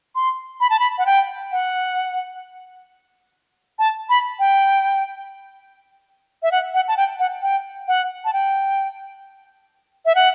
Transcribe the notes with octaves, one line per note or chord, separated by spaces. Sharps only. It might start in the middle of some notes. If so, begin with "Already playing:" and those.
C6
B5
A5
B5
F#5
G5
F#5
A5
B5
G5
E5
F#5
F#5
A5
G5
F#5
G5
F#5
A5
G5
E5
F#5